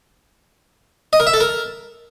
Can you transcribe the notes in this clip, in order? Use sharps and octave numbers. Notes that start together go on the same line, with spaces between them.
D#5
A#4
E5
A4
A#4